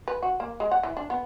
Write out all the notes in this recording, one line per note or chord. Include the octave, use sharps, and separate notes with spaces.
B4
F#4
A#3
G#3
F#5
E3
D4
B3